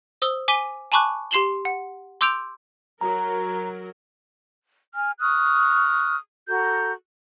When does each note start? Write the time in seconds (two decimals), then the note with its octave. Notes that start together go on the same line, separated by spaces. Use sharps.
0.22 C5 D#6 E6 G7
0.48 G#5 D6 B6 D#7 G7
0.92 G#5 A5 B5 C#6 D6 F#6
1.31 G4 C6 C7 E7 F#7 G7
1.65 F#5
2.21 C6 D6 E6 G6 D7 F7
3.01 F#3 A#4 A#5
4.94 G#5 F6
5.20 C#6 D#6 F6 F#6
6.48 F#4 A4 A#5 G6